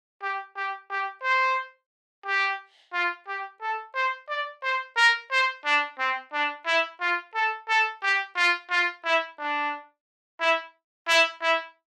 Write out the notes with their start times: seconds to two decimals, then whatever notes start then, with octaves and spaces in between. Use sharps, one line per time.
0.22 G4
0.56 G4
0.90 G4
1.23 C5
2.26 G4
2.93 F4
3.27 G4
3.61 A4
3.95 C5
4.29 D5
4.63 C5
4.97 A#4
5.31 C5
5.65 D4
5.99 C4
6.33 D4
6.67 E4
7.01 F4
7.34 A4
7.69 A4
8.03 G4
8.36 F4
8.70 F4
9.04 E4
9.38 D4
10.40 E4
11.08 E4
11.42 E4